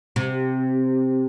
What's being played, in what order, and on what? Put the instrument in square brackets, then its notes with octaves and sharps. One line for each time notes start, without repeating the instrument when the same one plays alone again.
[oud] C3